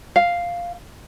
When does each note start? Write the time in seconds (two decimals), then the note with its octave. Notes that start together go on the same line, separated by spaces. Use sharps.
0.16 F5